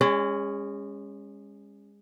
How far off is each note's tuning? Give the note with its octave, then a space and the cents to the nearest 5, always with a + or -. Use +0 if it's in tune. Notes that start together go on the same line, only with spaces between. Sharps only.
G#3 -30 C#4 +0 D5 +25